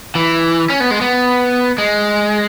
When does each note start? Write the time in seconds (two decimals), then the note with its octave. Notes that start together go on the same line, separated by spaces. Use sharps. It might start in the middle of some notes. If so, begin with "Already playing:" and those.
0.15 E3
0.70 C#4
0.80 B3
0.91 G#3
1.01 B3
1.78 G#3